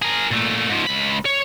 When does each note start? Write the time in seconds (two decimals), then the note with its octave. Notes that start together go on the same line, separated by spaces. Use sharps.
0.02 G#4 A#4
0.31 A#2 A3
0.69 G#2 F3
0.86 C#2 B5
1.26 C#5